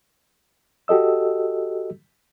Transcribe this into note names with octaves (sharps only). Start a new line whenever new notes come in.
F#4 G4 A4 D#5 E6